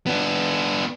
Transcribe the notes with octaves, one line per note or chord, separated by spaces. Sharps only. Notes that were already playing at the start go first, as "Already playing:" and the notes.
B3 D4